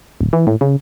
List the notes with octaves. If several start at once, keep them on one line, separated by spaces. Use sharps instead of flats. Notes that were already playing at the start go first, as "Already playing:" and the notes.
D1
E3
A2
C#3